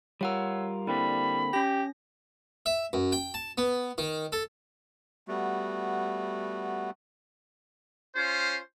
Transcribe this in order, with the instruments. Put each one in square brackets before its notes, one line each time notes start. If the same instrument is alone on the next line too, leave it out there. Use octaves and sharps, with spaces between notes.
[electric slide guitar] G3 F4 A#4 [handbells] C#5 F#5 E6
[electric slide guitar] D3 A#3 C4 [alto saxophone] G3 [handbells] E4 [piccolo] B5
[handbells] C#4 A#6 [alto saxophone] G4
[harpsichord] E5
F#2
G5
A5
B3
D#3
A4
[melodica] G3 A3 B3 F#4
[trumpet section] C#4 F4 C5